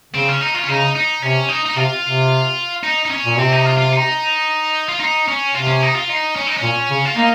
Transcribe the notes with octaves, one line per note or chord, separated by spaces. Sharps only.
C#3 C4
C#4
D#4
F4
C#4
C#3 D#4
D#4
C3 C#4
D#4
D#4
C3 F4
C3
D#4
D#4
C#4
A#2
C3 C4
D#4
F4
F4
D#4
F4
D#4
C#4
C3 F4
C#4
D#4
F4
D#4
C#4
D#4
C#4
A#2
C#3
F4
A#3 D#4